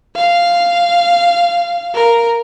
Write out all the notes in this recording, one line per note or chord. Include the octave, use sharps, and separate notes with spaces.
F5
A#4